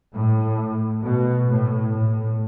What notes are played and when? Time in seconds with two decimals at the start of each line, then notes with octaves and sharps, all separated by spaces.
0.14 A2
1.03 B2
1.48 A2
1.92 A2